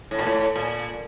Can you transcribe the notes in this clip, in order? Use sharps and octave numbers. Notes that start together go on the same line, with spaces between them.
A2
A#2
A2
A#2